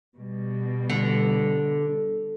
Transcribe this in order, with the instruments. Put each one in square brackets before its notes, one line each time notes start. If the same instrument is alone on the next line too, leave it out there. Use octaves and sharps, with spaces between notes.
[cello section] B2 G3
[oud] D3